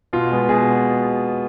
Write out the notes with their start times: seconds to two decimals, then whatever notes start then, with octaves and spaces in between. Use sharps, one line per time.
0.13 B2 F4
0.31 G#3 B3
0.49 B2 G#4